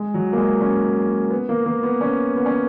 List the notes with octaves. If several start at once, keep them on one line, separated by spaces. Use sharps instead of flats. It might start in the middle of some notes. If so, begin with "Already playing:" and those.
Already playing: G#3
F#3
A#3
G#3
C#4
B3
A#3
A#3
B3
C#4
B3
C#4